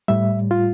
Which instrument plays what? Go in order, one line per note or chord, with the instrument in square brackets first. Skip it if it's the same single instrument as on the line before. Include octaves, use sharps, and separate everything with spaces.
[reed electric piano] A2 G3 E5
F4